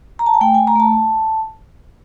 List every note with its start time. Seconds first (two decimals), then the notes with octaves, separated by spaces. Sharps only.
0.19 A#5
0.26 A5
0.34 G#5
0.41 A3 G5
0.54 A3 G#5
0.67 A#5
0.76 A3 A5